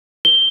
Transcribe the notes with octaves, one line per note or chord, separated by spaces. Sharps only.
G7